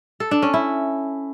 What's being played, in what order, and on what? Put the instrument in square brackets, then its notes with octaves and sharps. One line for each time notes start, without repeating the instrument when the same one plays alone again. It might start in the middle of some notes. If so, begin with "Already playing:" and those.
[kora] A4
D4
C#4
E4